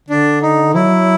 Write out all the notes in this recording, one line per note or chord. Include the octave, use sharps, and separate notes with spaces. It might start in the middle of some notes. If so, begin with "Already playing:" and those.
D3 D4
D#4
F#3 E4